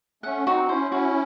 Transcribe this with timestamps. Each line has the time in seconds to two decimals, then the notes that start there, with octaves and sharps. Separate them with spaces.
0.23 A3 C#4 F#5
0.46 C4 D#4 F#4
0.64 D#4
0.69 C#4 E4 C5
0.92 C#4 E4 F#4